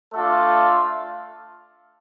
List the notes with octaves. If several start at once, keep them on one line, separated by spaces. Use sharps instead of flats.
A3 D4 F4 A4